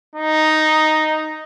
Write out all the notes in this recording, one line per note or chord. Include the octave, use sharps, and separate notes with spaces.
D#4